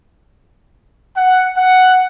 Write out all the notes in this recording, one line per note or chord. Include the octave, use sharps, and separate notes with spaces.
F#5
F#5